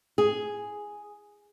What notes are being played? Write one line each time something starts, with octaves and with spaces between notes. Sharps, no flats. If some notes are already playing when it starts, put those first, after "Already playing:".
G#4